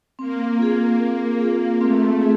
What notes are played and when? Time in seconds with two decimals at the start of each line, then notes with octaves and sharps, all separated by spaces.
0.19 A#3 C4
0.59 F4 G#4
0.99 A#3 C4
1.40 F4 G#4
1.81 A3 C4
2.21 G#4